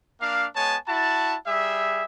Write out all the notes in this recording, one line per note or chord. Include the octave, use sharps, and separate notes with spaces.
A#3 D4 F5
G#3 B3 C#5 G#5 A5
E4 F#4 A5
G3 G#4 E5